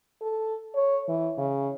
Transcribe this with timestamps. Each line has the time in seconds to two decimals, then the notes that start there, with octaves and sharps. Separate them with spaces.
0.22 A4
0.76 C#5
1.08 E3
1.38 C#3